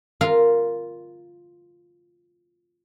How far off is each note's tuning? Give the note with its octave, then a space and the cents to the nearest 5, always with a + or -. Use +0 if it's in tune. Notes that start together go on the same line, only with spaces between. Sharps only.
F4 +0 A#4 +0 F5 +0